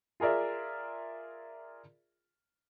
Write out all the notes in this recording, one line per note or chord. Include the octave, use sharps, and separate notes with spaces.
F4 G#4 A#4 D5 E5